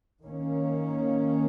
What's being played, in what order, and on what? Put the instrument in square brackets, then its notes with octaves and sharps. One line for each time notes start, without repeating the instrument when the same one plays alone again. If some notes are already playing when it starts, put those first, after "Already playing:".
[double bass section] D#3 A#3 C#4